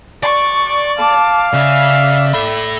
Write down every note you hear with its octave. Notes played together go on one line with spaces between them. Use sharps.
D5 C#6
F5 A5 D6
C#3 D5 E5
A4 B5